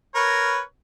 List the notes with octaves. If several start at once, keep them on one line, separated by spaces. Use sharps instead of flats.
A#4 B4 C#5